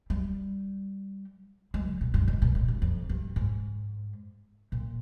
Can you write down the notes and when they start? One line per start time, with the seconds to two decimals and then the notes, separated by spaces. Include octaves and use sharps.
0.10 G3
1.74 G#3
1.87 C#3
2.01 A#2
2.14 G2
2.28 G#2
2.42 A#2
2.55 G#2
2.68 G2
2.82 F2
3.09 G2
3.36 G#2
4.72 A#2